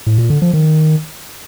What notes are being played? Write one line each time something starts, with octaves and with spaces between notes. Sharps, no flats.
A2
A#2
D3
F3
D#3